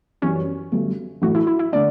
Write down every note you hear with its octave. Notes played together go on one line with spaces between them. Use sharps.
F#2 E3 G3 C#4
G1 G2 F#3 A3
A1 A2 F#3 A3 F#4
E4
E4
E4
D3 A3 D4 D5